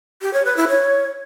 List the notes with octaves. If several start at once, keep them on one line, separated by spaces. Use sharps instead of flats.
G4
C#5
B4
E4
C#5